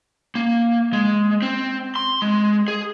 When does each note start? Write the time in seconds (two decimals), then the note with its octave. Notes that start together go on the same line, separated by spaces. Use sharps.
0.35 A#3
0.93 G#3
1.42 C4
1.96 C6
2.22 G#3
2.68 G#4